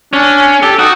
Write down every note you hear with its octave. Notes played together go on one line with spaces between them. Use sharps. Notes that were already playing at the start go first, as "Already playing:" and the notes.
C#4 D4
G4 A4
D#4 F#4